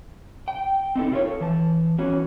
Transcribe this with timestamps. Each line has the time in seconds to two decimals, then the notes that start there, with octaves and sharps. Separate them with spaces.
0.48 G5
0.96 C4 D#4 E4 A4
1.11 C3 E4 F4 G#4 A#4 C#5
1.25 A4
1.41 E3 A5
1.98 E2 E3 C#4 F#4